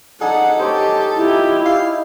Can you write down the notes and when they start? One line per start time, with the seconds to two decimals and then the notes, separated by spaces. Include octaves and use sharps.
0.21 D4 D#4 G#4 A4 F#5
0.59 G4 C5 C#5 D#5
1.16 E4 F4 G4
1.65 F5